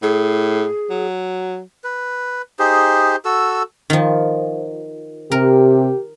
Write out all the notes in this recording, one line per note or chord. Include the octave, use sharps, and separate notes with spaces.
A2 G#4
F#3
B4
D#4 G4 G#4 C5
F#4 A4 E6
D#3 F3
C3 G4 A#4